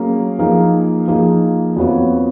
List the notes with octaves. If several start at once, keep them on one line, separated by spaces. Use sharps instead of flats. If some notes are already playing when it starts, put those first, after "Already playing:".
Already playing: F#3 A#3 C#4 G#4
F3 A#3 D#4 G#4
F3 A#3 D#4 G#4
F2 F3 B3 F#4 C#5